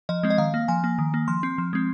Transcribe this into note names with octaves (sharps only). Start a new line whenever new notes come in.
F3 D#5
G#3 C4
D#5
D#3 F5
A#3
F3 G#5
A#3
D#3
A#3
F3 C6
C4
F3
G#3 C4